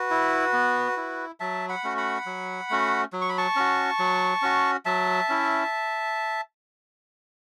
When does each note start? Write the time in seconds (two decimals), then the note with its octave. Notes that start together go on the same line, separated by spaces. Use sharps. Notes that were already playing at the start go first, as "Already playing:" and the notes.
Already playing: F#4 B4
0.10 E4
0.53 B3
0.97 E4
1.40 F#3 E5 A5
1.69 F#5 B5
1.84 A3 C#4 F#4
1.97 F#5 B5
2.26 F#3
2.70 A3 C#4 F#4
3.13 F#3
3.21 C#6
3.29 B5
3.38 A5 C#6
3.56 C#4 F#4
3.99 F#3
4.42 C#4 F#4
4.85 F#3 E5 A5
5.29 C#4 E4